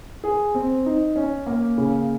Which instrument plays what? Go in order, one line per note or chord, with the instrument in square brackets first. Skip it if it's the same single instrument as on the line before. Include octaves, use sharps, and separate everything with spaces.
[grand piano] G#4
C4
D#4
C#4
A#3
C#3